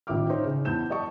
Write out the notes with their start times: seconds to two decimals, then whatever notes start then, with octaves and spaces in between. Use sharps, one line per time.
0.07 A1 D#3 F4 E5 D6 F6
0.29 D#4 C5 C#5
0.44 C#3
0.65 E2 E4 A5 G6 E7
0.90 D5 D#5 A5 C#6